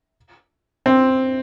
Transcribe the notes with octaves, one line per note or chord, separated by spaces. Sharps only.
C4